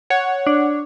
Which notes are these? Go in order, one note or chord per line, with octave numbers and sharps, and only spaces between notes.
C#5 F#5
D4